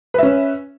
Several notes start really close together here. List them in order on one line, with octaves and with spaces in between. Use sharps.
B4 E5 C#4